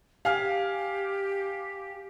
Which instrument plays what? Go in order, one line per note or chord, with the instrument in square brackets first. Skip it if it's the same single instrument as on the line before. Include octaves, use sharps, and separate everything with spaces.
[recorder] G4 [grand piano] F5 G#5 F6